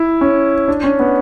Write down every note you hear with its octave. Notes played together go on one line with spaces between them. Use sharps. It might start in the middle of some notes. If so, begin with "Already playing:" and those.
Already playing: E4
C#4
D4
C#4
B3